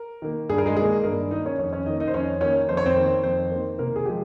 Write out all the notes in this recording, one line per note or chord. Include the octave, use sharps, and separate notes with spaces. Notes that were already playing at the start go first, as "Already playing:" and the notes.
Already playing: A#4
D#3 A#3
G2 G#4
A#4
G#3 G#4
D#3 G#3 A#3 G#4
G2 A#3 A#4
D#3 A#3 D#4 D#5
C#4 C#5
F2 C#4 C#5
C#4 C#5
D#3 A#3 D#4 D#5
D#4 D#5
C5
F2 C#4 C#5
D#3 A#3 C#4 C#5
F2 C5
C#5
C4 C5
D#3 A#3
F2 C4 C5
D#3 A#3
C3 A#3 A#4
G#4
F3 G#3 G4